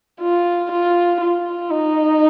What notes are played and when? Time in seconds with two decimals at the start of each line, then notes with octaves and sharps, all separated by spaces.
0.21 F4
0.72 F4
1.21 F4
1.71 D#4